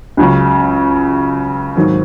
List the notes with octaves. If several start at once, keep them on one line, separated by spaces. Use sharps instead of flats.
C#2 C#3 F#3
G#2 D#3 F#3 C4